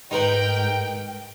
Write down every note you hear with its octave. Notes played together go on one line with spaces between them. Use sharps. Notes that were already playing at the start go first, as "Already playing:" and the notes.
G#2 D#4 A#4 B4 G5